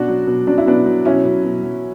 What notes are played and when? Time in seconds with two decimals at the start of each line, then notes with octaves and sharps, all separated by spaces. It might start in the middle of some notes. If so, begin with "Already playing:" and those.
Already playing: B2 D4 F#4
0.08 F#3
0.27 B2
0.47 F#3 D4
0.58 E4
0.66 B2 B3 D4
0.86 F#3
1.05 B2 C#4 E4
1.25 F#3
1.44 B2
1.63 F#3